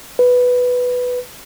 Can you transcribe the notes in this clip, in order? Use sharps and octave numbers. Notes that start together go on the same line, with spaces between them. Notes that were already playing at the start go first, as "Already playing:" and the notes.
B4